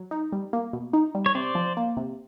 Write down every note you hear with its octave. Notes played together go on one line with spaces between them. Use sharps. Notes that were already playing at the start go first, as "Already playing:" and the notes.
Already playing: F#3
D#4
G3
A#3
B2
D#4
G3
C#5
C3 C5 D5
F3
A#3
C3